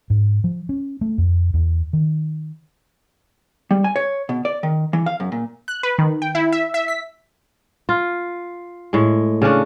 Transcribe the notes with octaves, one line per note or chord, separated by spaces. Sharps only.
G#2
F3
C#4
A3
F2
E2
D#3
G3
G#5
C#5
B2
D5
D#3
E3
F5
F#2
A#2
F#6
B4
D#3
G5
E4
E5
E5
B6
F4
A2 G#3
C#3 C#4 D4